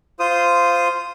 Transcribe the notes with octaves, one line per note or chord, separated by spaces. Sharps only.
F4 C5 D#6